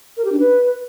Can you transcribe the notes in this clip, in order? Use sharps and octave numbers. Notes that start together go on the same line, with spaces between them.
A#4
G4
D4
B4